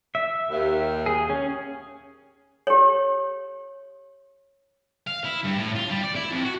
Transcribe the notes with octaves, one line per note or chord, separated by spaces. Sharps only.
E5
D#2
G#4
C#4
G4 C#5
F5
E4
G2
A2
F4
G3
D5
E4
F2
F#4